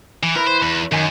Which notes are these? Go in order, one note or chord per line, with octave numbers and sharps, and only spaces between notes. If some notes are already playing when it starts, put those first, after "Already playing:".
E3
E4 A#4 B4
C5
E2
F#2 D#3 G#5